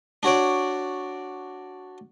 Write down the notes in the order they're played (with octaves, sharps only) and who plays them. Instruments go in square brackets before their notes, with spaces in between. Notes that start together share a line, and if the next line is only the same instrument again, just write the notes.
[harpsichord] D4 F#4 C#5 D5